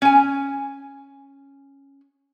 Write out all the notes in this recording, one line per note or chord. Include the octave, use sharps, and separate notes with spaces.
C#4 G#5